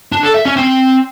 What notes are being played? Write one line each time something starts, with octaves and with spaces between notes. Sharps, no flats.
D4
A4
E5
C#4
C4